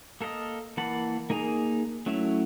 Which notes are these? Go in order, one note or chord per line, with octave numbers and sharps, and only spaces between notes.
A#3 A4 A#4 D#5
E3 A#3 F#5 A5 B5
A#3 D#4 G#4 G#5 A#5
F#3 A3 C#4 E4